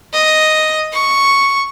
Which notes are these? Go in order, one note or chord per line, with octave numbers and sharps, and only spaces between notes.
D#5
C#6